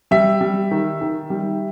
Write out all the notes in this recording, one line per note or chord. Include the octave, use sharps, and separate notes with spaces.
G3 E5
G3
D#3
D#3
G3